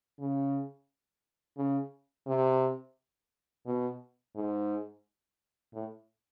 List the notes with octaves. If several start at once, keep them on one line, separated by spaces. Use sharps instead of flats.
C#3
C#3
C3
B2
G#2
A2